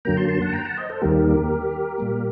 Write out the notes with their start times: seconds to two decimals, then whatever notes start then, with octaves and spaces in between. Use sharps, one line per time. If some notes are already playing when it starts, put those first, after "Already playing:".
0.05 F#2 D3 F#3 A#3 G5 A#5
0.17 A5 C6
0.29 A5 C6
0.42 F#5 A5
0.53 G5 A#5
0.65 F#5 A5
0.77 C5 D#5
0.89 A4 C5
1.02 D#2 D#3 G3 A#3 G4 A#4
1.98 A#2 G3 A#3